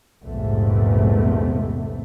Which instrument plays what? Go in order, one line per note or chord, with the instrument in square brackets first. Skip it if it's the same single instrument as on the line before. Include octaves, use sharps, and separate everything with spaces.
[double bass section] A#1 E2 G#2 C3 A3